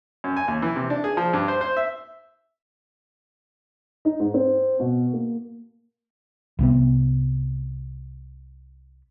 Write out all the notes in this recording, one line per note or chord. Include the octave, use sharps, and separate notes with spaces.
F#2
G#5
D#2
E3
C3
D4
G#4
F3
G2
C5
C5
E5
D#4
G#2
C4
B2
A#3
C2 C3 B3